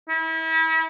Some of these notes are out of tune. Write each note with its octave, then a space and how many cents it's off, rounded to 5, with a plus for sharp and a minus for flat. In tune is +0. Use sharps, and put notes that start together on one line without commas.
E4 -35